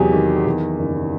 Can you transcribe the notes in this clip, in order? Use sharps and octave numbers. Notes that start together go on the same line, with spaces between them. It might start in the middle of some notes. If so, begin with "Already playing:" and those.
Already playing: E2 C3 F#3 G4 G#4
D#3
E2
F#1